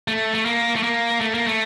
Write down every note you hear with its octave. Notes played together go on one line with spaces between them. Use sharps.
A3
A3
A#3
A3
A#3
A3
A#3
A3